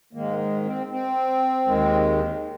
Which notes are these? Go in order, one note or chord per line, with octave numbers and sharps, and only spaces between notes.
G#2 D#3 G#3 A#3
G#3
C4
C4
D#2 D#3 G#3